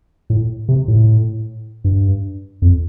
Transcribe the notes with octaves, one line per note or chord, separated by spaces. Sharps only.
A2
C3
A2
G2
F2